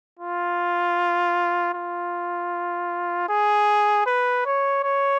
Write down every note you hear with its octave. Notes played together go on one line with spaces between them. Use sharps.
F4
F4
G#4
B4
C#5
C#5